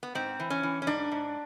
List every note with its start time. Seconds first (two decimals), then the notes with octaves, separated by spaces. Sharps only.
0.03 B3
0.15 G#2 C4
0.40 E3
0.50 C#4
0.63 E3
0.82 C#4
0.87 G#2 D4
1.12 G#2